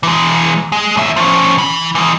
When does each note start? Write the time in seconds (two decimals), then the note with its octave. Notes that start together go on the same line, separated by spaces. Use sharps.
0.03 E3 G#3
0.72 G#3
0.97 D#2 E5
1.16 F3 C#4
1.58 E3 B5
1.95 E3 G#3